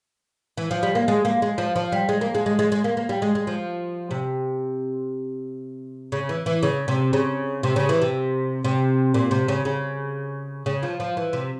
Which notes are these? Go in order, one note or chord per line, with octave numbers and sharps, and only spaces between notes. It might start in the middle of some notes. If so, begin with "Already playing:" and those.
E3
F3
G3
A#3
G#3
A#3
G#3
F3
F3
G3
G#3
A#3
G#3
G#3
G#3
G#3
A#3
A#3
G3
G#3
G#3
F3
C3
C#3
E3
E3
C#3
C3
C#3
C3
C#3
E3
C3
C3
A#2
C3
C#3
C#3
C#3
F3
F3
E3
C3